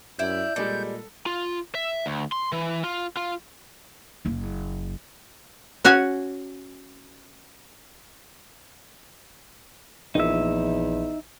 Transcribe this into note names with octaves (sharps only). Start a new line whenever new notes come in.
F#2 D4 E4 E5 G6
A#2 G3 G#3 A4 D5
F4
E5
D2
C6
E3
F4
F4
F#1 A#3
C#4 F#4 F#5 G#5
A#1 E2 D#4 E5